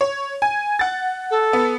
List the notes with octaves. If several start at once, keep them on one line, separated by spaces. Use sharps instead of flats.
C#5
G#5
F#5 A6
A4
B3